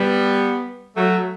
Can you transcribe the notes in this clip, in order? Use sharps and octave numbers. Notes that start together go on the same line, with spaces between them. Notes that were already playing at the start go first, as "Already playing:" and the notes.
Already playing: G3 B3
F#3 A3